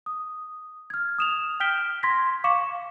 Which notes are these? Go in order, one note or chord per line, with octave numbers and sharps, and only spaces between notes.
D#6
F6 G#6
D#6 E7 F7
G5 F6 G6 B6 D7 G7
C6 G#6 A#6 B6
F5 C#6 D6 C#7 E7